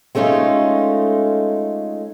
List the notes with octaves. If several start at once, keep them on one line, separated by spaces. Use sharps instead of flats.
G#3 A3 C#4 D#4 F4